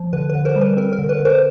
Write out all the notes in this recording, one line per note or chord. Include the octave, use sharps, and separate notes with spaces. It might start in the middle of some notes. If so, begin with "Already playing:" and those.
Already playing: F3
D3 B4
B4
D3
A#4 C5
G3
B4
C4 A#4
A#4
D3
B4
D3
A#4 C5